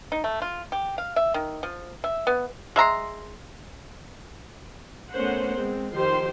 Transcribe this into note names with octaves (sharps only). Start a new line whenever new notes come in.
D#4
A3
F4
G4
F5
E5
D#3
F3
E5
B3
G#3 E5 A#5 C6
A3 B3 C#4 A#4 C5 F#5
G#3 C4
D#3 F3 G4 C5 C6